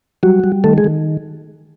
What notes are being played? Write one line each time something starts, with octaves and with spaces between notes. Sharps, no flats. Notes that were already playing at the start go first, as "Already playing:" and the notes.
F#3 G3 F#4
G3
D#3 A3 A4
G#3 G#4
D#3